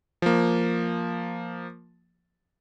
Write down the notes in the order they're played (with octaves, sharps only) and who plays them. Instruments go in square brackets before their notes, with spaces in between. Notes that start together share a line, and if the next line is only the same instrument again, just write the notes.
[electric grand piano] F3 A#3